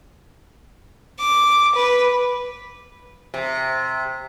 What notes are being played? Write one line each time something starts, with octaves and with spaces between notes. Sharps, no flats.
D6
B4
C3